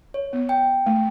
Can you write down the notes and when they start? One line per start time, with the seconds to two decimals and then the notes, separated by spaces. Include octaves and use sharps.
0.14 C#5
0.33 B3
0.49 G5
0.86 A3